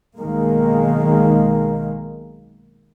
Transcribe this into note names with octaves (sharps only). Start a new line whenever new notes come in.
B1 D#3 G#3 A#3